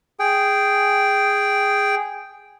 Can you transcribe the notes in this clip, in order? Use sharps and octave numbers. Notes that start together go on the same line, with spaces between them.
G#4 G5